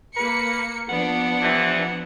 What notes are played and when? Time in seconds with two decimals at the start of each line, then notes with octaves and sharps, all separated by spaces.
0.16 A#3 B4 C#7
0.89 F3 B3 D4 F#5
1.41 C3 E3